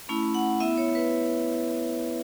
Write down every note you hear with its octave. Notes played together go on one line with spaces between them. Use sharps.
A3 C#4 E4 B5
F#5
B3 E4 E5
C#5
B4